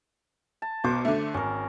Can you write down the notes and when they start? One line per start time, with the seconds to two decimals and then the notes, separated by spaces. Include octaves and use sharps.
0.62 A5
0.84 B1 B2 C5 D6
1.05 D3 A3
1.34 G#1 C#4 A#4